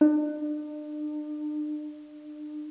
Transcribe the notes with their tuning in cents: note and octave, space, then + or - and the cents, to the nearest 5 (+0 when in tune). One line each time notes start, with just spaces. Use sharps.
D4 +40